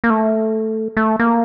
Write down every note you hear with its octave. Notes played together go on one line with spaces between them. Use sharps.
A#3
A3
A3
A#3